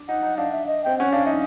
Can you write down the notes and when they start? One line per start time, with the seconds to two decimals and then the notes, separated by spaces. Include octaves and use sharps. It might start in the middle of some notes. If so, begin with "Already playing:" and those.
Already playing: D4
0.08 D#4 F#5
0.23 D#4
0.37 D4 F5
0.52 E5
0.67 D#5
0.84 C4 G5
0.98 C#4 F#5
1.12 D4 F5
1.25 D#4 E5